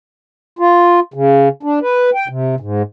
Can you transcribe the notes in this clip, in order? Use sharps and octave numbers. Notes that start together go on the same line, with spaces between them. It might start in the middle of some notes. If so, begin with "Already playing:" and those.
F4
C#3
D4
B4
G5
C3
G#2